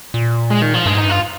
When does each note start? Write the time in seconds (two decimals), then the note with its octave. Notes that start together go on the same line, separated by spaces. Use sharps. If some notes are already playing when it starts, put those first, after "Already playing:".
0.14 A#2
0.51 G#3
0.62 D#3
0.74 F3
0.86 G2 G#3
0.95 G#2 D#4
1.04 G2 F4